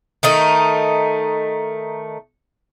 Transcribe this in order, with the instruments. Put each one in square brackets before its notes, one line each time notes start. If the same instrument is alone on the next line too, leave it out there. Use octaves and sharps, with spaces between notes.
[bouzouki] D#3 A3 D#4